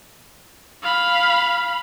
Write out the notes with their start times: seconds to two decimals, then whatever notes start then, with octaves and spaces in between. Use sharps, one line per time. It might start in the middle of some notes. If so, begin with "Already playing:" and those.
0.83 F5 B5